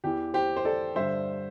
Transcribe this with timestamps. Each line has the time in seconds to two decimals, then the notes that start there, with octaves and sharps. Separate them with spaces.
0.04 E2 E3 G4
0.34 G4 C5
0.56 C5
0.65 A4 D5
0.96 G2 D3 C5 E5